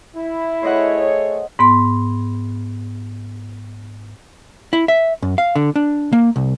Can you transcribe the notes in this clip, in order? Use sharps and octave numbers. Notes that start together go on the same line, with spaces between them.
E4
A3 G#4 C5 C#5 D#5 F#5
G#2 B3 C6
E4
E5
F#2
F5
D3
D4
A#3
C2